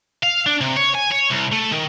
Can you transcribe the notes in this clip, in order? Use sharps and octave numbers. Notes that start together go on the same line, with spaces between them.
F5
D4
C3
C#5
G#5
C#5
C2
A3
D#3